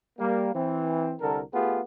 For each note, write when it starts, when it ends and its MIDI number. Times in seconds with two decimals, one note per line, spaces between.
0.19 0.53 55
0.19 0.53 58
0.54 1.14 52
0.54 1.14 60
1.20 1.40 36
1.20 1.40 50
1.20 1.40 69
1.20 1.40 70
1.53 1.80 57
1.53 1.80 59
1.53 1.80 65
1.53 1.80 67
1.53 1.80 68